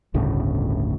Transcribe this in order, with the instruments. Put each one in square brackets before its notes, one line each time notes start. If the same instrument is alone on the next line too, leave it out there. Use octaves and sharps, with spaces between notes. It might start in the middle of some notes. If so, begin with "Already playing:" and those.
[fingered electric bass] G1 D2 A2 C#3